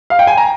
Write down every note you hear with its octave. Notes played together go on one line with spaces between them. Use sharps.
F5
G5
G#5
A#5